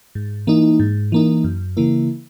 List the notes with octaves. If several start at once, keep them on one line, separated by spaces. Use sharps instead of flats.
G#2
E3 A#3 D#4
G#2
E3 A#3 D#4
F#2
C#3 E3 A#3 E4